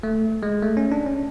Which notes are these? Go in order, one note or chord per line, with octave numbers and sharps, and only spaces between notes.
A3
G#3
A3
C#4
D4
C#4